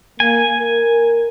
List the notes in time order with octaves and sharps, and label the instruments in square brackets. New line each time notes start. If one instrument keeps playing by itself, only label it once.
[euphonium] A#3 [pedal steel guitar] G#5
[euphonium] A#4